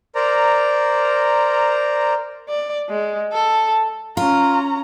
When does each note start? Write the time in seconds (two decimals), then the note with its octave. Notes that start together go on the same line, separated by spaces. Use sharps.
0.15 A#4 C5 D5 A#5
2.49 D5
2.89 G#3
3.33 A4
4.17 C#4 F4 A#5